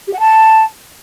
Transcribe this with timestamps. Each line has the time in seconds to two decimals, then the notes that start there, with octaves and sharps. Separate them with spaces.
0.07 G4
0.13 F#5
0.19 A5